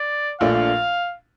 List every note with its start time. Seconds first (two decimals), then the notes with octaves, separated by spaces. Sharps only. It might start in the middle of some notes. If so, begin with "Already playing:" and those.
Already playing: D5
0.40 A#1 A#2 F3 A3 D4 F5